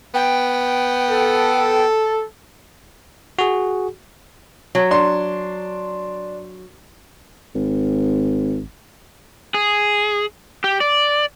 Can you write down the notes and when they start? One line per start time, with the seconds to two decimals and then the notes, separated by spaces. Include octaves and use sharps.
0.14 B3 G5
1.10 A4
3.39 F#4 G#4
4.75 F#3
4.91 D4 C6
7.55 G#1
9.54 G#4
10.64 G4
10.80 D5